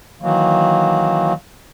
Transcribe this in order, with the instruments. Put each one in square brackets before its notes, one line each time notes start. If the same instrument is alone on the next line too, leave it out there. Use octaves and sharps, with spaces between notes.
[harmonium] D#3 E3 F#3 A#3